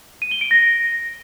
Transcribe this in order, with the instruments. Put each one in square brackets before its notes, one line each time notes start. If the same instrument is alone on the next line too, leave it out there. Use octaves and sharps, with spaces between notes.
[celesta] D#7
G7
D7
A#6